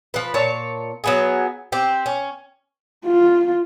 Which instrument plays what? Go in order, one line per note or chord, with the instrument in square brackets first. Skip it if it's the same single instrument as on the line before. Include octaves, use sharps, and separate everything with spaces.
[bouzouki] F3 B4
A#2 C#5 A5
F#3 B3 G#4
C4 G4
C#4
[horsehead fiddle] F4